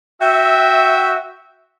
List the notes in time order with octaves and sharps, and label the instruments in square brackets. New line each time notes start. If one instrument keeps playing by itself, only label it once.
[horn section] F#4 E5 [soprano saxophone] G5